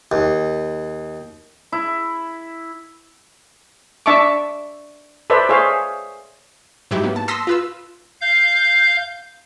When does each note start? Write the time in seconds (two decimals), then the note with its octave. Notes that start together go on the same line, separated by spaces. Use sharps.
0.12 D#2
1.72 E4
4.06 D4 E5 A5 C#6 D6
5.30 A4 B4 C5 D5 E5
5.49 G#4 C5 C#5 E5 F5
6.91 G#2 F#3 E4 G4
7.03 A#3 B3
7.16 A5
7.28 A5 C6 D#6 E6 A#6 B6
7.47 F4 B4 E6
8.21 F5 G6